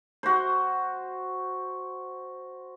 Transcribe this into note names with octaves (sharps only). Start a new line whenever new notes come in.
F#4 C5